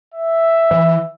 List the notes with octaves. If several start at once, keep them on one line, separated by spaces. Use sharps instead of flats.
E5
E3